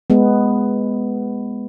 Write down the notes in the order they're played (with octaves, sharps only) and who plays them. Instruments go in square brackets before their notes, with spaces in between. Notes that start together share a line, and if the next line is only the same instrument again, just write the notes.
[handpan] G#3 B3